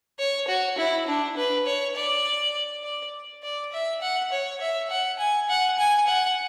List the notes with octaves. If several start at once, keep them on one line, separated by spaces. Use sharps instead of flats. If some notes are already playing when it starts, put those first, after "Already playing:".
C#5
F#4
E4
D4
B4
C#5
D5
D5
D5
E5
F#5
C#5
E5
F#5
G#5
F#5
G#5
F#5